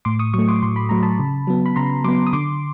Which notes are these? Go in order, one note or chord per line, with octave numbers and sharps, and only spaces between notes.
A2 C6 D6
C#6 D#6
F#3 A3 C#6 D#6
C6 D6
A2 C6
B5
F#3 A3 A#5
A5 B5
C#3
F#3 B3
B5
C#3 A#5 C6
F#3 B3 C6 D6
D#6
D3 C6 D6